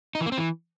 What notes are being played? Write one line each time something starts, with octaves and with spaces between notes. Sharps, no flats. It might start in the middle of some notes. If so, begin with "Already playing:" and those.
D#4
E3
A#3
C4
E3